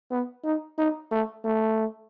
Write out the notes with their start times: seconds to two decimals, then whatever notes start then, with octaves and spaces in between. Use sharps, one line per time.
0.11 B3
0.44 D#4
0.78 D#4
1.11 A3
1.45 A3